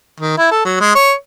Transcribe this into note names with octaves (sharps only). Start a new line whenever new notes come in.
D#3
E4
A4
F#3
G#3
C#5